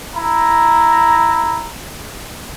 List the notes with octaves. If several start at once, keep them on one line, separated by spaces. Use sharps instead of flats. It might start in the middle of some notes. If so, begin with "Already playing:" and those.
E4 A#5